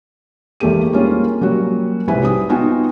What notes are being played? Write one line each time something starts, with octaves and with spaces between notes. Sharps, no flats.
G#1 E2 A3 A#3 G4 D#7
G3 A#3 C4 C#4 F4 G#4
F#3 G3 A#3 C#4 F#4
B1 G#2 C3 E4 B4 G#5
G3 C4 D#6
B3 D#4 F4 F#4 G5 G#5